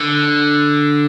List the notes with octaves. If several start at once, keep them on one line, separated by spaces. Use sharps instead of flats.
D3